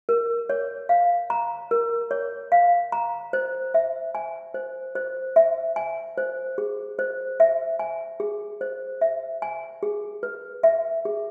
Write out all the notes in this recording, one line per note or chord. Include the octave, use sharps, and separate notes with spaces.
A#4
C#5
F5
A#5
A#4
C#5
F5
A#5
C5
E5
G#5
C5
C5
E5
G#5
C5
G#4
C5
E5
G#5
G#4
C5
E5
G#5
G#4
B4
E5
G#4